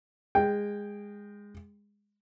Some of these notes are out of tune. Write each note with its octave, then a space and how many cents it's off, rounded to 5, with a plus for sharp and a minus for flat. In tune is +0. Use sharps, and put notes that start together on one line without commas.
G#3 -20 G5 +0